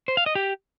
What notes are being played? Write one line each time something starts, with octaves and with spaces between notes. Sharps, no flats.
C5
F5
D#5
G4